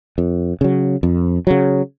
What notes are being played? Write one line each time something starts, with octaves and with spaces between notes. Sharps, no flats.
F2
C#3 F#3
F2
C#3 F#3